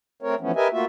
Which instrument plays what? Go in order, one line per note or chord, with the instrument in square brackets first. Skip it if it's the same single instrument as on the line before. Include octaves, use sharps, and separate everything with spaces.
[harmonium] A3 C4 A#4 C#5
E3 F3 A3 B3 C#4
G4 A#4 B4 D#5 E5 G#5
A3 A#3 F4 F#4 E5